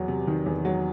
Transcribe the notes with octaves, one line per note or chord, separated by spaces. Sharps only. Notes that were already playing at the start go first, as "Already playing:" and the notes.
Already playing: E2 F#3
C3
D#3
E2
F#3